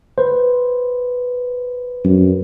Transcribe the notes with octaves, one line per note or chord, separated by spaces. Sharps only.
B4 C5
F#2